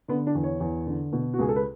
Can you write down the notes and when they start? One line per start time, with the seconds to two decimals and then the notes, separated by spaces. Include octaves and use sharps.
0.08 D3 B3
0.27 D4
0.35 E2
0.43 C#5
0.60 E2
0.86 D3
1.12 B2
1.34 F#4
1.39 C#2 G#4
1.49 A4
1.56 B4